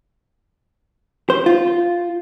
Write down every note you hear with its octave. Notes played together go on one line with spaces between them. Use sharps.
C5
F4